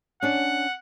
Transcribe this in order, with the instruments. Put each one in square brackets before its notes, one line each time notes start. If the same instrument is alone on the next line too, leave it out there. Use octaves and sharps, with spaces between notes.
[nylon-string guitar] C#4 D4 [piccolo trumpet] F#5